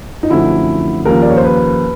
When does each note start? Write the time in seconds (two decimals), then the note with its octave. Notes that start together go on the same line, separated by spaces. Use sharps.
0.23 D#4
0.30 F#2 D3 F3 A3 C4 E4
1.05 D#2 C#3 F3 A#3 A#4
1.22 D5
1.30 C#5
1.37 C5
1.44 B4